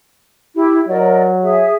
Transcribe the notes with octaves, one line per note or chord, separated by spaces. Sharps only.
E4 G4
F#3 A#4 D5 D#5
G#4 E5